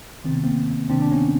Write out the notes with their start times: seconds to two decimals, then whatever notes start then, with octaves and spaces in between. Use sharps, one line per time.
0.24 C3 D#3 C4
0.35 B3
0.43 A#3 C4
0.90 C3 D#3 C4 D4
1.02 D4
1.12 B3 C#4